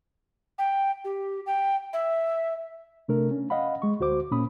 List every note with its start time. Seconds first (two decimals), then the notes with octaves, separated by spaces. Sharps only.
0.58 G5
1.04 G4
1.46 G5
1.93 E5
3.08 C3 A3 D4 A#4
3.31 C#4
3.50 D#5 F5 F#5 B5
3.82 G#3 C#6
4.00 D2 F#4 C5 D6
4.31 A#2 A#3 C#4 B5 D#6